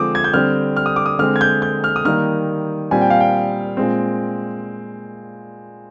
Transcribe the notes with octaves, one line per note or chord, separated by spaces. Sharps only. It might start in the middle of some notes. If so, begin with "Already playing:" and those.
Already playing: D3 F3 G#3 C4 D6 D#6
G#6
G6
D3 G3 C4 F6
F6
D#6
D6
D#6
D3 G#3 C4 F6
G#6
G6
G6
F6
D#6
D#3 G3 A#3 F6
A#2 G3 C4 G#5
G5
F5
G5
A#2 G#3 C4